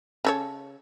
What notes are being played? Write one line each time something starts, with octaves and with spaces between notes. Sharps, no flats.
C#3 A4 C#5